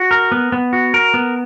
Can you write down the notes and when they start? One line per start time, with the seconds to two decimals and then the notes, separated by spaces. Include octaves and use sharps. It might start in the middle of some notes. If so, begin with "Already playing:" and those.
Already playing: F#4
0.11 A#4
0.32 B3
0.52 B3
0.73 F#4
0.94 A#4
1.14 B3